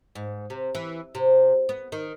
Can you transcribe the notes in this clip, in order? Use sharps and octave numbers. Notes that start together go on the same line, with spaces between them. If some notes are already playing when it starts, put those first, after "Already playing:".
G#2
C3
E3
C3
B3
D#3